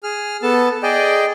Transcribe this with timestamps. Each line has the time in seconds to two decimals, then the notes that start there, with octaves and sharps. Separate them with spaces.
0.03 G#4 F6
0.43 B3 A4 A5
0.83 G#4 D5 D#5 G5